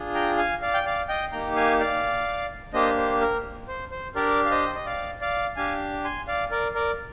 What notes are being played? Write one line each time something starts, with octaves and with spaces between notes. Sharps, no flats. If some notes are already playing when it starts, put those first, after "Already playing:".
Already playing: D4 F4 G#4
G5 A#5
F5 G#5
D5 F5
G5
D5 F5
D#5 G5
A#3 D#4 G4 G5 A#5
F5 G#5
D5 F5
A#3 D4 G4 C5 D#5
C5
A#4
C5
C5
D4 G4 A#4 D5
F5
C5 D#5
D#5
D5 F5
D5 F5
D4 G4 F5 G#5
G#5 C6
D5 F5
A#4 D5
A#4 D5